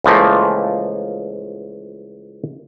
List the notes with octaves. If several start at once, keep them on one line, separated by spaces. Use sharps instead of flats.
C#2 E3 F3 A3 A#3